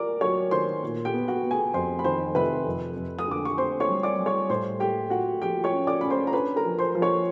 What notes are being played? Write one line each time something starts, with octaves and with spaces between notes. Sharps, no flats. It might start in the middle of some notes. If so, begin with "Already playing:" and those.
Already playing: A#4 D5 A#5 D6
F#3 C#5 C#6
D#3 C5 C6
A#2
G4 G5
B3
F#4 F#5
B3
G#4 G#5
F2 C5 C6
B5
D#3 C5 C6
C3 B4 B5
F2
F2
D#6
D3 D6
C#6
C4 C5 C6
C#5 C#6
G3
D5 D6
G3
C#5 C#6
A2 C5 C6
A3 G4 G5
A3 F#4 F#5
F3 G4 G5
C#5 C#6
C#4
D5 D6
C#4 B5
C5 C6
A#5
D4 B4 B5
A#4 A#5
F3
C5 C6
F3
C#5 C#6